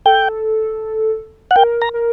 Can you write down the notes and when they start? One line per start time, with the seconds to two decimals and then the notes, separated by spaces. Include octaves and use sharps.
0.05 A4 G5
1.51 F#5
1.56 A#4 G5
1.82 A#5
1.94 A#4